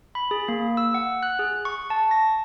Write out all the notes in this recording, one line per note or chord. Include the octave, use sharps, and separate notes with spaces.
B5
G#4
A#3
E6
F#5
F#6
G#4
C#6
A5
A#6